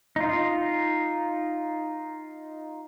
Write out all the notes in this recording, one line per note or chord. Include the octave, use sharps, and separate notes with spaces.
D#4 F4